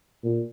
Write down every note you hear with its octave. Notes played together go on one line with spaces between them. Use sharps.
A#2